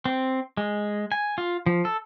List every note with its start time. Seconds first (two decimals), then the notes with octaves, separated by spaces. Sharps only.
0.06 C4
0.57 G#3
1.12 G#5
1.38 F4
1.66 F3
1.85 A4